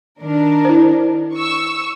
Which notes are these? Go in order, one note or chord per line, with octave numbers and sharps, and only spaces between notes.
D#3 D4 A#4
E4 C5
C#6 E6